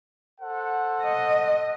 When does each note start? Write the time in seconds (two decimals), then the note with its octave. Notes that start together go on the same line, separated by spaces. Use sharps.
0.41 A4 C5 F#5
1.03 D#5